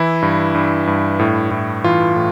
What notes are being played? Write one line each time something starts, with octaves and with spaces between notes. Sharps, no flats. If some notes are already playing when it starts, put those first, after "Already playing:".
Already playing: E3 E4
G2
G2
G2
A2
A2
E3 F4
A2